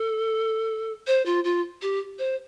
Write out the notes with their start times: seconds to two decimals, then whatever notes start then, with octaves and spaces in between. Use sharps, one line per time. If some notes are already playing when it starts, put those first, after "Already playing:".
Already playing: A4
1.07 C5
1.26 F4
1.44 F4
1.82 G4
2.19 C5